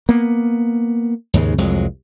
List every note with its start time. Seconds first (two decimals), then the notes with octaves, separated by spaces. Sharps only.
0.09 A#3 B3
1.34 D#2 G#2 C#3 G#3
1.58 C2 F2 F#3 G#3